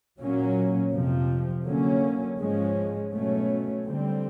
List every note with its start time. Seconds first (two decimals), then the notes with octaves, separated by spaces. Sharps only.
0.19 A#2 F#3 A#3 C#4
0.93 F2 C3 F3
1.66 D3 F#3 A#3 C#4
2.40 G#2 F3 G#3 C#4
3.13 B2 F#3 A3 C#4
3.87 D3 G3 C4